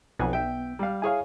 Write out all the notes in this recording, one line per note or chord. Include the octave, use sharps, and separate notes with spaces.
B1 F2 B3 F#5 G#5
E5 G5
G3 F5
E4 G#4 C#5 F5 G#5